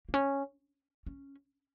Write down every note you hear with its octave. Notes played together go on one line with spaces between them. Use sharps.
A#3
C#4
C#4